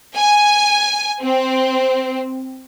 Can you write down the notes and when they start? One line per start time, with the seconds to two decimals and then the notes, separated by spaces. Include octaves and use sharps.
0.16 G#5
1.22 C4